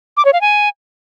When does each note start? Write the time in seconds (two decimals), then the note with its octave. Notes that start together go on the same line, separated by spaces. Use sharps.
0.17 D6
0.25 C#5
0.33 F5
0.41 G#5